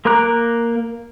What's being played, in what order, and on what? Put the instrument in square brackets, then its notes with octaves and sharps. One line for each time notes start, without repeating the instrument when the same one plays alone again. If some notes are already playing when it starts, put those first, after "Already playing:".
[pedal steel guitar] A#3 A#4 A#5 D6 F#6